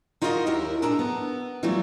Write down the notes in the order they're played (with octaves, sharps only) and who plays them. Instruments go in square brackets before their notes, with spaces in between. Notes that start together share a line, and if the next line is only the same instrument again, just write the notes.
[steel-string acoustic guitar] D#4 F4 F#4 A#4 B4 D#5
D#2 E4 G4 A#4
A#2 G#3 D4 A4 A5 A#5
B3
E3 F#3 G3 A3 E4 F4